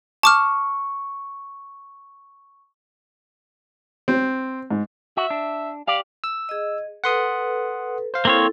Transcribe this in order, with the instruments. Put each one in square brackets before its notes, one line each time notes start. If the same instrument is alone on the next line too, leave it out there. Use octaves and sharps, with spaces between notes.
[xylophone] A5 D6 F6 [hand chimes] C#6
[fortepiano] C4
G#2
[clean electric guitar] F#4 [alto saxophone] E5
[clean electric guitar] D4
[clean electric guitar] G4 D5 [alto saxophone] F5
[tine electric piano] E6
[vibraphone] G#4 D#5
[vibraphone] A4 B4 [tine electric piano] F#5 C6 D#6
[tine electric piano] C5 F5
[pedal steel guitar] A#3 C4 C#5 [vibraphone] E4 A4